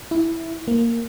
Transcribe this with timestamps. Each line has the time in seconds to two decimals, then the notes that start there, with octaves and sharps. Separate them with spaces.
0.11 E4
0.68 A#3